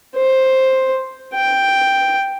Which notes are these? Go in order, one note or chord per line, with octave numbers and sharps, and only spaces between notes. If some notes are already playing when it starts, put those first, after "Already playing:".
C5
G5